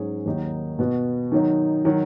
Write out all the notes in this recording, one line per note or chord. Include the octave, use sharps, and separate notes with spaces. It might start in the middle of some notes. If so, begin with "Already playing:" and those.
Already playing: G#2 F#3 C#4 G#4 C#5
D#2 D#3 F#3 D#4
B2 B3 F#4
D#3 F#3 D#4
D#3 F#3